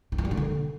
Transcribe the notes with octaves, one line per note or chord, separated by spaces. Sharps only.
D#3
E3
G3
D#3
D3